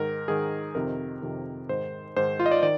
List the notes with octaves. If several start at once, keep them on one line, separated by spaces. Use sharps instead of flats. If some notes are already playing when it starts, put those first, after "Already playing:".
Already playing: G#2 D#3 A#4
G#2 D#3 G#4
F2 C3 D#3 A#4
F2 C3 D#3
G#2 D#3 C5
G#2 D#3 C5
F4
D#5
D5
D#3 D5